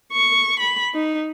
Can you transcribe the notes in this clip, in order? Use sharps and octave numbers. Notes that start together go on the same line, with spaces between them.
C#6
B5
D#4